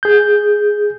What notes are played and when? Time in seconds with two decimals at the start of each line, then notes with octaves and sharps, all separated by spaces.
0.03 G#4 G6